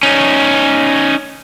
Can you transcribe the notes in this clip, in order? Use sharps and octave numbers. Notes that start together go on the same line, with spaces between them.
C#4 D#4